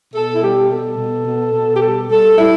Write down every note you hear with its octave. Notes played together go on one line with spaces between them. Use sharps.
B2 A4
E4
G3 G4
B2 A4
B2
B2
B2
G4
G3 A4
G3 A4
G3 E4